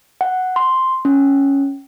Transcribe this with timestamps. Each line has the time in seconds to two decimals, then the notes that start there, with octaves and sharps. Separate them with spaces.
0.21 F#5
0.56 C6
1.05 C#4